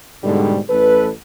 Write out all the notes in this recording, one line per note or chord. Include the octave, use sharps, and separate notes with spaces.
G#2 B2 D3 G3
A1 A4 B4